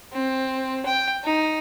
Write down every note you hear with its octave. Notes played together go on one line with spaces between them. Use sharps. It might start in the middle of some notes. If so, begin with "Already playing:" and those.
C4
G5
D#4